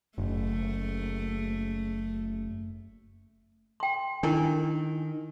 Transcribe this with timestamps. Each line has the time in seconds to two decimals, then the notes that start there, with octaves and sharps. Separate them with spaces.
0.18 F#1 A3
3.80 G5 C6
4.23 D#3 D4 E4 A#4